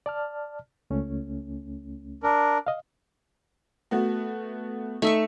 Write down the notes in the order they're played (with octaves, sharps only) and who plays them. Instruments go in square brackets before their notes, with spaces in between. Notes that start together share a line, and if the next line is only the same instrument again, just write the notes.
[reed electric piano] D5 A5 F6
C#2 A3 C#4
[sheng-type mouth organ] D4 A#4
[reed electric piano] D#5 F5
[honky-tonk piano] A3 B3 F#4
[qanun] A3 E5 C#6 [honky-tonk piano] D#4